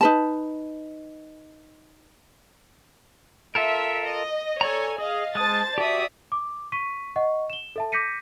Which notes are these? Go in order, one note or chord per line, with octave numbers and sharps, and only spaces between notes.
D#4 B4 A5
F4 A4 A#4 E5
D#5
A4 C#5 D5 G#5 A#5
G#4 D#5 F5
G#3 C5 A5 D#6 A6
F#4 G4 D5 E5 D#6
D6
C#6 B6 D#7
D#5 F#5 C#6
E7 G7
A4 E5 A5
D6 G6 A#6 B6 C#7 D#7